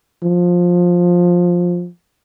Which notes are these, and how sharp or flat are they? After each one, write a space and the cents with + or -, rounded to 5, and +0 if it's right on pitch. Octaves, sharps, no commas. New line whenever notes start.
F3 +15